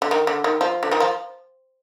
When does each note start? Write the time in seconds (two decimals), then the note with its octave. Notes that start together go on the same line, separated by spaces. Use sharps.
0.02 D3
0.11 D#3
0.27 D3
0.44 D#3
0.61 F3
0.83 D3
0.91 D#3
1.00 F3